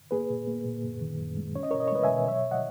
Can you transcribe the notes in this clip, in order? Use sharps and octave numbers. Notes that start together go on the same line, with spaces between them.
A#3 G#4 B4
A#2
A#3
A#2
F#2
D#3
F#2
G#3
C#4 C#5
D#5
A#4 C#5
B2
D#5
C#5
G#3 B4 D#5
E5 G#5
B2
F#3 C#5 E5
D#5 F#5